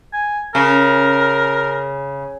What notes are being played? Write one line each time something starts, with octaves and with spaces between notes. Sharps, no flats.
G#5
C#3 A#4